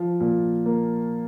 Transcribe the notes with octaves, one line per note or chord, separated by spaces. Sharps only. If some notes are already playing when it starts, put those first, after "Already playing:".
Already playing: F3
A#2
A#3